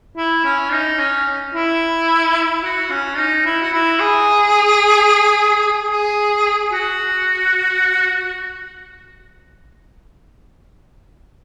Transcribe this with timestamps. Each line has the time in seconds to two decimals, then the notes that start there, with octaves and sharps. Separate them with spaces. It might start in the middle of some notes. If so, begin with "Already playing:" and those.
0.17 E4
0.45 C#4
0.72 D#4
0.99 C#4
1.54 E4
2.63 F#4
2.91 C#4
3.17 D#4
3.45 E4
3.62 F#4
3.73 E4
4.00 G#4
5.91 G#4
6.72 F#4